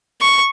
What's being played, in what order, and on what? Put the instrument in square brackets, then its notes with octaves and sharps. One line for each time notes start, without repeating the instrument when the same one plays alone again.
[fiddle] C#6